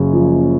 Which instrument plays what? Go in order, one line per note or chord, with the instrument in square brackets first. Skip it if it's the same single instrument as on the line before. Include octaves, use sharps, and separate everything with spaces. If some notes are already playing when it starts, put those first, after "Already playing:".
Already playing: [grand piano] F#1 F#2 C#3
F3